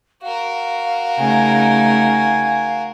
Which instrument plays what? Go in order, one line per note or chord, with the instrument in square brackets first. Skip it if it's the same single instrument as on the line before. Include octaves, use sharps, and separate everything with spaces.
[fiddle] F#4 A#4 [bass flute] F5
[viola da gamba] C#3 A3 D#4 [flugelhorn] G#5